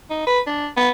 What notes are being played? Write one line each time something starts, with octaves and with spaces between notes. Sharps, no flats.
D#4
B4
D4
B3